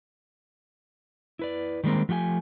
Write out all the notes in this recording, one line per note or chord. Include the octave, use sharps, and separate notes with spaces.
E4 B4 D5
D#3 G3 G#3 A#3 C4
F3 A3 G4 G5 G#5